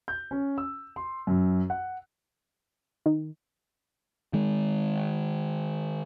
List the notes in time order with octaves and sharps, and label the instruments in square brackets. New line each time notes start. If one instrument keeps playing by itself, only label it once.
[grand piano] G6
C#4
E6
C6
F#2
F#5
[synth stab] D#3
[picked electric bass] D#3 G#3